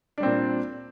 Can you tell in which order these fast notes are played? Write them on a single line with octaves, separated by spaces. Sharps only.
D4 G3 C4 A#2